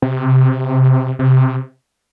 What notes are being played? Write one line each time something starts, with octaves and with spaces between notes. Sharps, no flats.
C3
C3